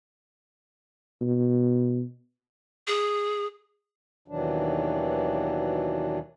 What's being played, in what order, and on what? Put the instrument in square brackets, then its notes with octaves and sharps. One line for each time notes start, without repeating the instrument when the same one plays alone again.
[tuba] B2
[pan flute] G#4
[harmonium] D#2 B2 D#3 E3 F#3 D4